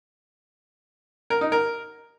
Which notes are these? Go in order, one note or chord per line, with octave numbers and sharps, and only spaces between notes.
A#4
D#4
A#4